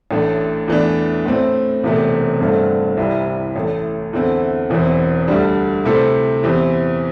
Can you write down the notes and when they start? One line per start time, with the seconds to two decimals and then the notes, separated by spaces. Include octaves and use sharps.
0.11 A1 A2 A3 D4
0.68 E2 E3 A3 D4
1.25 A2 A3 C4
1.83 E1 E2 C3 A3
2.40 G1 G2 D3 A3 C4
2.97 C2 C3 G3 E4
3.56 A1 A2 A3
4.13 E2 D3 C4 E4
4.70 E1 E2 E3 C4
5.27 D2 D3 G3 D4
5.85 C3 A3 E4 A4 C5
6.43 E2 E3 C4 G4